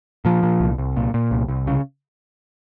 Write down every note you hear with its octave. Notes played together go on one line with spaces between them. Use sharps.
A#2 F3
A#2
C2
C2
A#2
A#2
C2
C2
C#3